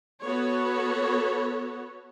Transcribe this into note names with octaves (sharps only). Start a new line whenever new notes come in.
B3 F#4 A4 C#5